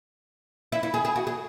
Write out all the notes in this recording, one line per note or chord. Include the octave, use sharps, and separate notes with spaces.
E4
E4
G#4
G#4
F#4
G#4